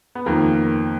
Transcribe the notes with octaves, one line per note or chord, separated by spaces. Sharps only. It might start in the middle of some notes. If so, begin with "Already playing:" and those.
B3
F2 D#3 A#3